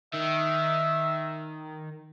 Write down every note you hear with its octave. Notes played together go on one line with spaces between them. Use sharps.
D#3 E5